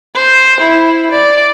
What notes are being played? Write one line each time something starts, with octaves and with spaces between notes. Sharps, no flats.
C5
E4
D5